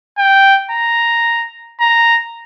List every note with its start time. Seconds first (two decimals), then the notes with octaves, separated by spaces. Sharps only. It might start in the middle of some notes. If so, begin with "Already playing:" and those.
0.18 G5
0.71 A#5
1.81 A#5